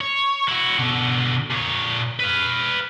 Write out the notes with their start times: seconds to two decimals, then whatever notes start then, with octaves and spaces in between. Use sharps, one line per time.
0.01 C#5
0.48 E4 F#4
0.79 B2 D3
1.51 A#2 C#5
2.20 B4 F5